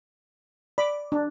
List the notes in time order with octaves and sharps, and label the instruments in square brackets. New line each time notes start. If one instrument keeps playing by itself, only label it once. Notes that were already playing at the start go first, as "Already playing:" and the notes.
[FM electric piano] D5 [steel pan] B5 D6
[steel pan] D4